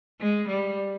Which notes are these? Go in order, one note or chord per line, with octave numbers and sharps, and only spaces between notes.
G#3
G3